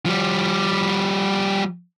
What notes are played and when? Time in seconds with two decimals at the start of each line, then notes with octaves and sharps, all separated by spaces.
0.06 F3 G3